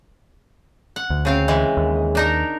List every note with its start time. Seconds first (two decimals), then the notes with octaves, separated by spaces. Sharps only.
0.96 F#5
1.10 D2
1.25 C#3 C4 F5
1.48 E3 G#3
1.77 D#2
2.15 D4 D#4 A#4